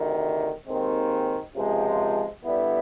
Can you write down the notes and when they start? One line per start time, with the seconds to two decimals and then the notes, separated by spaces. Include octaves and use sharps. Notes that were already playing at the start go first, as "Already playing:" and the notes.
Already playing: D2 C3 D#3
0.67 D#2 D#3 G#3 C4
1.55 C#2 C3 F3 G#3
2.43 G2 D3 G3 B3 E4